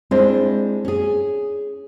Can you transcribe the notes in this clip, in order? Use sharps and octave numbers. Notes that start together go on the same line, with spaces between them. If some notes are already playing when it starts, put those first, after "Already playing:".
G#3 C4 D4 E4 C5
C#4 G#4